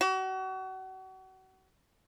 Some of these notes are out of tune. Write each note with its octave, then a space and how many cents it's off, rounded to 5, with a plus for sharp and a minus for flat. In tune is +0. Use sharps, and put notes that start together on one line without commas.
F#4 +35